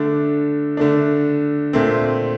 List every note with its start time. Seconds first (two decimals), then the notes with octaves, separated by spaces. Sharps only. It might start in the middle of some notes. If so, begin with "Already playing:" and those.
Already playing: D3 A3 D4
0.77 D3 A3 D4
1.73 A#2 A3 C4